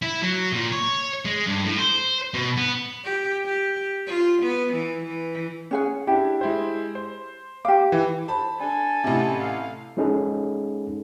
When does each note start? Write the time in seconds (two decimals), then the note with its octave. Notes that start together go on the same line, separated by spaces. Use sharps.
0.02 E4
0.22 F#3
0.52 A#2
0.72 C#5
1.25 G#3
1.46 G2
1.65 A2
1.78 C5
2.34 B2
2.57 B3
3.04 G4
3.45 G4
4.07 F4
4.42 B3
4.73 E3
5.05 E3
5.71 C#4 G#4 F#5
6.07 D4 E4 G4
6.41 G#3 E4 C5
6.95 C5
7.65 G4 F5 D6
7.92 E3
8.28 C5 A5 B5
8.60 D4 A4 G#5
9.04 A1 C3
9.41 F5
9.97 G#3 C#4 D#4 G#4 A4